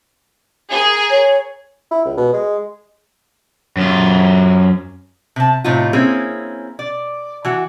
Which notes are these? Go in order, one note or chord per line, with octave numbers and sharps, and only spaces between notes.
G#4 A#4
C#5
E4
C#2
B2
G#3
F#2 F4
C3 A5
A2 C3 D#4 F4
A#3 C4 C#4 E4 G#4
D5
E3 F#4